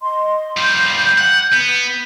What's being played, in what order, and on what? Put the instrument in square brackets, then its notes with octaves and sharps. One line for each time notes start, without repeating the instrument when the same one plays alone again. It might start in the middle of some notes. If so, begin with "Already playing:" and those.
[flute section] D#5 C6
[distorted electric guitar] G3 F4 [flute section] G6
[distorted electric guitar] F#5
B3